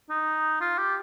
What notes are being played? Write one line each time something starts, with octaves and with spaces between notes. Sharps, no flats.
D#4
F4
G4